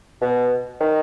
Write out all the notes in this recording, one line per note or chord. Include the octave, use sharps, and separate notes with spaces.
B2
D#3